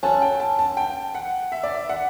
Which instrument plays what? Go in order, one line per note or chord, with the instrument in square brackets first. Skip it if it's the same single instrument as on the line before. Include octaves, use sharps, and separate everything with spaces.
[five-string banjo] C#4 F#4 A4 [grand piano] A5
[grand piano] G5
A5
A5
G5
F#5
E5
D5
E5
F#5